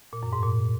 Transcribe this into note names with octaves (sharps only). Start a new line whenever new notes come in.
A#2
F#2
G#2
A#2